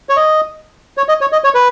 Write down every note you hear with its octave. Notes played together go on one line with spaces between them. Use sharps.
C#5
D#5
C#5
D#5
C#5
D#5
C#5
B4